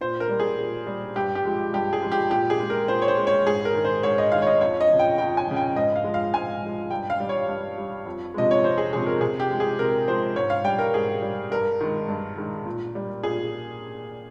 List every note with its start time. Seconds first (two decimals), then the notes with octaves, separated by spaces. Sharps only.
0.01 A#2 C5
0.20 A#4
0.29 G3
0.40 G#4
0.59 A#2
0.87 G3
1.16 G2 G4
1.35 G4
1.44 F3 G#3
1.74 G2 G4
1.93 G#4
2.03 F3 G#3
2.12 G4
2.30 A#2 G4
2.50 G#4
2.60 G#3
2.70 A#4
2.88 A#2 C5
3.02 C#5
3.08 C5
3.18 G#3
3.27 C#5
3.47 G#2 G#4
3.65 A#4
3.75 D#3 G#3
3.85 C5
4.03 G#2 C#5
4.18 D#5
4.32 D#3 G#3 F5
4.42 C#5
4.47 D#5
4.61 F2 C#5
4.81 D#5
4.90 C#3 F3
4.99 G5
5.18 F2 G5
5.37 G#5
5.47 C#3 F3
5.56 G5
5.76 G#2 D#5
5.96 F5
6.04 F3 G#3
6.14 F5
6.33 G#2 G#5
6.62 F3 G#3
6.90 G2 G5
7.10 F5
7.20 G3
7.29 C#5
7.48 G2
7.78 G3
8.06 F2
8.34 C3 F3 G#3 D#5
8.51 C#5
8.63 F2 C5
8.78 G#4
8.93 C3 F3 G#3 G#4
9.06 A#4
9.21 C3 G#4
9.40 G4
9.50 F3 G#3
9.60 G#4
9.79 C3 A#4
10.07 F3 G#3 C5
10.36 G#2 C#5
10.50 F5
10.64 G3 G5
10.79 A#4
10.94 G#2 G#4
11.22 G3
11.51 G2 A#4
11.80 D#3 G#3
12.08 G2
12.37 D#3 G#3
12.66 A#2
12.95 G3
13.23 A#2 G#4